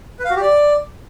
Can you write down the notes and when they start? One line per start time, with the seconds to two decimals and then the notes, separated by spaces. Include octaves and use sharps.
0.19 B4
0.25 F5
0.30 F#4
0.36 G4
0.41 D5